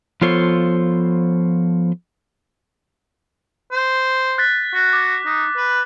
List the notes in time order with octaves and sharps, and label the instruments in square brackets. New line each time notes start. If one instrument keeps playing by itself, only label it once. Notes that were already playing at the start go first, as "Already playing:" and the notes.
[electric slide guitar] F3 B3 F4 A4 C5 C#5
[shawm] C5
[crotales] F#6 A6 B6
[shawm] F#4
[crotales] D6 A6
[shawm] D#4
B4